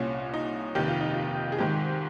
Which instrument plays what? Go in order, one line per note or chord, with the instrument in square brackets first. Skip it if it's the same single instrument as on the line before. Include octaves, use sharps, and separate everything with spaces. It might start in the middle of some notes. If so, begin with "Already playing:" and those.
Already playing: [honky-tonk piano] C2 A#2 C#4
D#4
F1 D#2 D#3 G4
F4
D#4
F4
G#4
G#1 G#2 D#3 G4